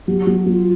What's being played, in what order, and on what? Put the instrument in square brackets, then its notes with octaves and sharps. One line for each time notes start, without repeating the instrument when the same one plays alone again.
[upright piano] F#3 [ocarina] G4
[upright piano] F#3
[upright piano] F#3 [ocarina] F4